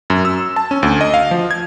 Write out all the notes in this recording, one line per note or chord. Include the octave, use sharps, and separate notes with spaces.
F#2
E6
A5
C#4
D2
D#5
F5
F3
G#6